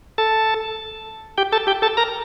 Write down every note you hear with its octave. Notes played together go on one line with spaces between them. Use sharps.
A4 A5
G4 G5
A4 A5
G4 G5
A4 A5
A#4 A#5